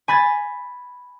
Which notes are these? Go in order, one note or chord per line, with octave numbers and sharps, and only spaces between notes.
G#5 B5 G#6 A6